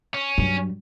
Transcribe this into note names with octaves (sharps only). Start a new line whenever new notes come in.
C#4
G2 F#3